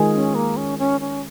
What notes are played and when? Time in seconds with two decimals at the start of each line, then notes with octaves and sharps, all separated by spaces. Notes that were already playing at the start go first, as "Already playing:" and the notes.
Already playing: D#3 G#3 F4 G#4
0.14 C#4
0.35 A#3
0.57 C#4
0.79 C#4
1.00 C#4